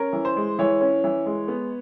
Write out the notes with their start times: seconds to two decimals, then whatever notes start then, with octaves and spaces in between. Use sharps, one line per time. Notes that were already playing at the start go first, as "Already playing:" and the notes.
Already playing: C#4 A#4
0.13 E3
0.25 C5
0.37 G#3
0.59 E3 C#5
0.81 C#4
1.04 E3
1.26 G#3
1.48 B3